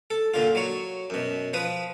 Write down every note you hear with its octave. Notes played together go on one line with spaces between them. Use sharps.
A4
A#2 D3 F4
F#3 C#5
F#2 B2
F3 B4 D#6